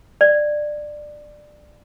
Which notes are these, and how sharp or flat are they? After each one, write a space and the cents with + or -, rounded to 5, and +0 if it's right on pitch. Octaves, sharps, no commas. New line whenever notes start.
D5 +15